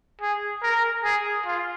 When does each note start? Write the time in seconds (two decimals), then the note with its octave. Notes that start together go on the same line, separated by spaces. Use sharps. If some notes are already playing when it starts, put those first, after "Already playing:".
0.21 G#4
0.63 A#4
1.04 G#4
1.45 F4